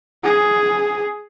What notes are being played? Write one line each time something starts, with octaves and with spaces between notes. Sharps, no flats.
G#4